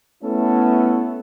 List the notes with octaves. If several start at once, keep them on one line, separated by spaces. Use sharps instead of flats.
A3 B3 C#4 E4 A4